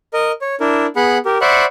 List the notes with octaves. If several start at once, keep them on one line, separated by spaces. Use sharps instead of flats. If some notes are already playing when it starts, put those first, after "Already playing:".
A#4 D#5
C#5
D4 E4 A#4
B3 G#4 F#5 B5
G4 A#4
C5 D5 E5 F#5 B5 C#6